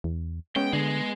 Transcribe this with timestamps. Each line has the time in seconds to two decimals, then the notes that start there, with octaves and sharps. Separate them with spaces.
0.04 E2
0.56 G#3 B3 C#4 G5
0.73 D3 G#4 D#5